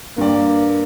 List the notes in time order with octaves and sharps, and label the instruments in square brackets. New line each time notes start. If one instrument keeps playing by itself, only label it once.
[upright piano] G2 D5 [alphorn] A#3